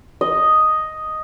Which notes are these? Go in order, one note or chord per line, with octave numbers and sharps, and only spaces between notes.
D#5